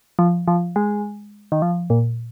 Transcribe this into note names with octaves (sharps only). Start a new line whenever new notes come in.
F3
F3
G#3
D#3
F3
A#2